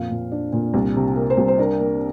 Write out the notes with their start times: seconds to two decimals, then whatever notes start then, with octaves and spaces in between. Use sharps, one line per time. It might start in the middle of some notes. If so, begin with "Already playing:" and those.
Already playing: F2 A#2 F5
0.10 A#2
0.32 D4
0.53 A#2
0.74 C2
0.96 C3
1.16 A#3
1.30 C5
1.37 C2
1.48 C5
1.58 D4 A#4
1.80 A#3